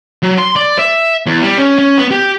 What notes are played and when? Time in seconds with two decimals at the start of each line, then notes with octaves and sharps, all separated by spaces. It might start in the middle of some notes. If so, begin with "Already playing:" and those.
0.23 F#3
0.38 C6
0.56 D5
0.79 E5
1.26 E2
1.42 G3
1.57 C#4
1.79 C#4
1.98 B3
2.11 G4